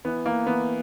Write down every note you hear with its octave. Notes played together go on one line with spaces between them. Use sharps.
E3 B3
E3 A#3
E3 B3